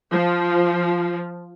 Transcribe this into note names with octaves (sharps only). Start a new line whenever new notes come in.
F3